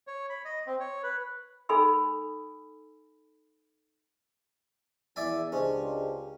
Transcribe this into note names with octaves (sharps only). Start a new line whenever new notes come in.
C#5
B5
D#5
C4
C#5
B4
D#4 A4 G#5 B5 E6
E2 E3 D5 E5 G#5
C#2 C#4 D4 G4 G#4 C5 D#5